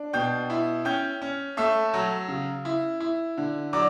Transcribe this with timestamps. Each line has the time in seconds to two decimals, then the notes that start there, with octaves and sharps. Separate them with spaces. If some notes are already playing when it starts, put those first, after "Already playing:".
Already playing: D4
0.13 B2 G5 G6
0.50 E4
0.85 C#4 G5 G6
1.22 C#4
1.57 A3 E5 E6
1.94 F#3
2.28 C#3
2.65 E4
3.00 E4
3.37 D3
3.73 F#3 D5 D6